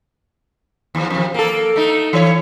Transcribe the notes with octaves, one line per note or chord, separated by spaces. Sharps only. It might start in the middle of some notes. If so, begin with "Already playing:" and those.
D#2 F3
F2 C3
A#3 A4
A3 D#4
E3 C#5